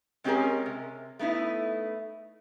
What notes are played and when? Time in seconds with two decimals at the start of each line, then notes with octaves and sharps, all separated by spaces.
0.24 G#3 C4 C#4 G4 G#4 A#4
0.66 C3
1.19 A3 B3 D#4 E4